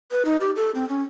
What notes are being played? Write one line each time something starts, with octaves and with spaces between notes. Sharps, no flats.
B4
D#4
G4
A4
C4
C#4